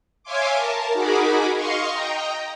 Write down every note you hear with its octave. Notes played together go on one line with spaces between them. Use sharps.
C#5 E5 F5 G#5 C6 D6
A#4 A5
D#4 F#4 G#4 A#4 B5 D6
D#5 F5 C6 C#6
D#5 G5 A#5